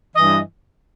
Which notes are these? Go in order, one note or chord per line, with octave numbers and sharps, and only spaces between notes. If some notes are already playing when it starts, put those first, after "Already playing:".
G2 E3 D#5